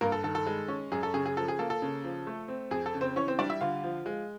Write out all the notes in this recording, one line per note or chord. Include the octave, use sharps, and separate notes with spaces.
G2 A#3 A#4
A4
D#3 A4
A4
G#3
C#4
F#2 G#4
A4
C#3 G#4
G#4
F3 A4
G#4
A#3 A4
A4
C#3
F3
A3
C4
F2 G#4
A4
C#3
C4 C5
E3 C#4 C#5
C4 C5
G3 D4 D5
E4 E5
D3 F4 F5
F3
G#3